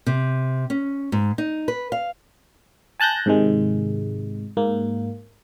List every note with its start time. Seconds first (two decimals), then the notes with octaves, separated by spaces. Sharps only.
0.06 C3
0.70 C#4
1.12 G#2
1.38 D#4
1.68 B4
1.92 F5
3.00 G#5 A5 F#6 G6 A#6
3.26 G#2 C3 D#3 G#3
4.57 G#2 A#3